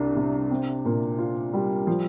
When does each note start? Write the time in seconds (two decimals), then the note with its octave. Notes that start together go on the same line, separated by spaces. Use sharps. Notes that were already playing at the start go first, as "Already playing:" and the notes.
Already playing: C2 D4
0.16 C3
0.51 C4
0.85 A#2
1.19 F4
1.53 G3
1.87 F3